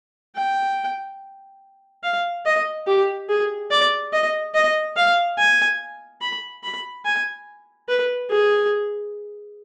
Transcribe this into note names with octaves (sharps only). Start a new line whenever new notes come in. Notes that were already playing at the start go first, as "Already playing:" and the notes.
G5
F5
D#5
G4
G#4
D5
D#5
D#5
F5
G#5
B5
B5
G#5
B4
G#4